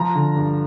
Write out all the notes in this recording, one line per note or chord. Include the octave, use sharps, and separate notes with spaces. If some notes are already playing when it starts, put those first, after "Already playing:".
Already playing: F3 A#5
D3
G2